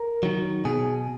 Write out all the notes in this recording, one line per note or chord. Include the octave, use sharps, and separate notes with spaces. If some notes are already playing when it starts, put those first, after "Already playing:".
Already playing: A#4
D#3 F#3
B2 G#4